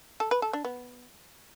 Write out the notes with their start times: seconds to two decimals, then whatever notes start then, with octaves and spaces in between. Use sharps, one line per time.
0.20 A4
0.31 B4
0.42 A4
0.53 D4
0.65 B3